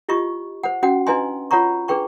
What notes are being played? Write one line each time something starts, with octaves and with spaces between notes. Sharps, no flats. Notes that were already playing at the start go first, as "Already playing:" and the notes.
E4 F4 G4 D#5 C#6
C5 F#5
C#4 F#4 F#5 G5
D4 E4 B4 D#5 G#5 C6
F4 C#5 F#5 A#5 C#6
D4 G#4 B4 G5 C#6